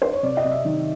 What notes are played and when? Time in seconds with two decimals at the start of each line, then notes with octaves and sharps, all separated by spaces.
0.02 C5
0.13 C#5
0.23 C3 D5
0.37 D#5
0.44 C3
0.51 E5
0.65 D#3